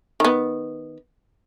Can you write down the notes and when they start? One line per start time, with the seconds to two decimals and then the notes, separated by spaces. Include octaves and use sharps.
0.20 D#3 B3